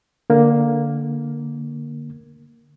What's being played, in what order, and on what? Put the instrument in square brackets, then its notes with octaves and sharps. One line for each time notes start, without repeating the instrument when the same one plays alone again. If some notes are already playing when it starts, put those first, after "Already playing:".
[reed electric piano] D3 A#3